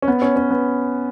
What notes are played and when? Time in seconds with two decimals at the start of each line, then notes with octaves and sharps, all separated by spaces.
0.02 C#4
0.08 B3
0.22 C#4
0.36 C#4
0.50 B3